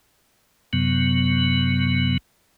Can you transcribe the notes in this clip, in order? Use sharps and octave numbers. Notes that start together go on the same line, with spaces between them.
F#2 C3 F#3 B3